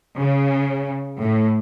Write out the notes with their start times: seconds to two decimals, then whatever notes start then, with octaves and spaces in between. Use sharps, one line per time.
0.18 C#3
1.21 A2